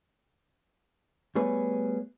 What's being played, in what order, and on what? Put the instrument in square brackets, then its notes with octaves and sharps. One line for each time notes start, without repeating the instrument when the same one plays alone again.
[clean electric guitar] G3 A3 B3 G#4 B4 C#5